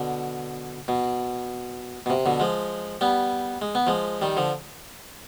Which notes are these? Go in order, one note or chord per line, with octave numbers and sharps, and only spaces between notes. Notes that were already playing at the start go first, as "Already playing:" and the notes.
Already playing: B2 D3
B2
B2
C3
B2 D3
F3 G#3
G3 B3
G#3
B3
F3 G#3
D#3 G3
D3 F3